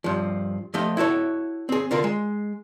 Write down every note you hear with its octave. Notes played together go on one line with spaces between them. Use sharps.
G2 F3
F3 A3 G4 D#5
E4 F#4 A4 C#5
C4 G#4
D3 F4 A#4
G#3